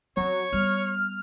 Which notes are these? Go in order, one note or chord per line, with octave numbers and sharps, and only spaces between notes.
F#3 C4 C#4 C#5
G3 B3 F6